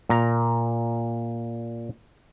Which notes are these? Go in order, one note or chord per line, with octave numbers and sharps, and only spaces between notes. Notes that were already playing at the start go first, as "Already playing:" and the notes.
A#2 A#5